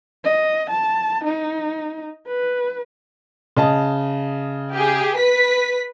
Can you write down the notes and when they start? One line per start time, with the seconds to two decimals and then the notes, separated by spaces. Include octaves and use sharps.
0.24 D#5
0.70 A5
1.24 D#4
2.27 B4
3.56 C#3 D#5 A5
4.75 G4 G#4
5.17 B4 B6